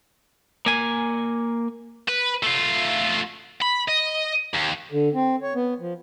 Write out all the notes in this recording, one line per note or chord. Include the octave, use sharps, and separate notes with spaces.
A#3 G#5
B4
A3 F4
B5
D#5
D#2
D3
C4
C#5
B3
F3